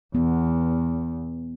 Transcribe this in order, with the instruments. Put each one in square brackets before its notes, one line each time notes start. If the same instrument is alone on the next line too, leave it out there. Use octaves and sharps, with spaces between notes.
[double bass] E2 [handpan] B3